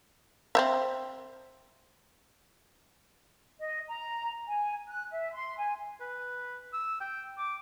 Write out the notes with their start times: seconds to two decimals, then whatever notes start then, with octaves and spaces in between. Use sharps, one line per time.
0.55 C4 C5 E5
3.59 D#5
3.89 A#5
4.48 G#5
4.87 F#6
5.11 E5
5.34 C6
5.58 G#5
6.00 B4
6.73 E6
7.00 G5
7.38 D6